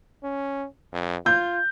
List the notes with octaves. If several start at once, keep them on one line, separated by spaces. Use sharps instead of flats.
C#4
F2
F4 G6